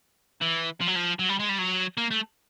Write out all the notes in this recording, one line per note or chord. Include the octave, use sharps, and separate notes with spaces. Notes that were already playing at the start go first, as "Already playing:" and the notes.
E3
F3
F#3
F3
F#3
G3
G#3
G3
F#3
A#3
A3